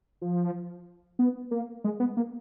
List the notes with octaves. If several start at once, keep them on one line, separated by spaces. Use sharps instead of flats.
F3
B3
A#3
G#3
B3
A#3